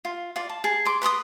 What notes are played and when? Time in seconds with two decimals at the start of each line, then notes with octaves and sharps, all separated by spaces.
0.05 F4
0.36 F4 D5
0.49 A5
0.64 G#4 A5
0.85 C6 D6
1.02 B4 C6 D6 D#6